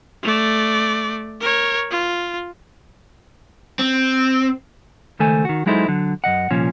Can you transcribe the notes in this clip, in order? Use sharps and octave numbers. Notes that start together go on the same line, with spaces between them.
A3 D5
A#4 C#5
F4
C4
C#2 D#3 A3 A4 C5 G#5
D#3 F#4
F#3 G#3 D#4 E4 A4 C5
D3 F#3
F#2 B2 D#5 F#5
C2 A#2 F3 C#4